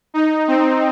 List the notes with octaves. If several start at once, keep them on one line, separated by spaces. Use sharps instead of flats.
D#4
C4